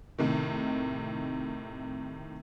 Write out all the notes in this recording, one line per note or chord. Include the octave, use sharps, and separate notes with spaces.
A2 C3 D#3